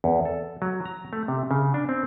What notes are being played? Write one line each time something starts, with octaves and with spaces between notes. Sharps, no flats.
E2
A4
F#3
A#5
A3
C3
C#3
D4
C4